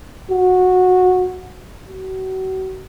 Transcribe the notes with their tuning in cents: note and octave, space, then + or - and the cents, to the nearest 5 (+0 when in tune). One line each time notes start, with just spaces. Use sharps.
F#4 -15
F#4 +35